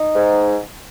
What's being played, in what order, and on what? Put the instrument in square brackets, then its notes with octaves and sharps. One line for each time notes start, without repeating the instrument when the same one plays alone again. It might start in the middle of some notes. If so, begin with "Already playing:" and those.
Already playing: [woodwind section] D#4
G#2